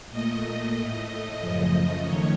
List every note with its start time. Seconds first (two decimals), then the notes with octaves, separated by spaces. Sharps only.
0.11 A#2 A3 D#5
0.75 A2 A3 D#5
1.40 F#2 C#3 F3 A3
2.05 D#3 A3 C#5